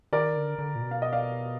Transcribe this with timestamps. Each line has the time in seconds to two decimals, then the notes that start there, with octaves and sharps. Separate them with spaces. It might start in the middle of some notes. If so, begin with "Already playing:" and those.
0.13 D#3 A#4 D5
0.36 D3
0.59 D3
0.75 A#2
0.81 B2
0.91 F5
1.02 D#5
1.12 D5 F5